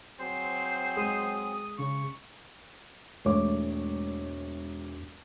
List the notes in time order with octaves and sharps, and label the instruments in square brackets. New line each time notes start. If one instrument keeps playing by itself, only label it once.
[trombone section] F#3 C4 G#4 [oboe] C5
[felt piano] G#3 [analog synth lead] D#6
[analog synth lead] C#3 [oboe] C#6
[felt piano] E1 G#2 A3 C#5 D6